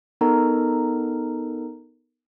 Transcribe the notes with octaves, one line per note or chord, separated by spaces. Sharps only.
B3 D#4 A4 A#4 A#5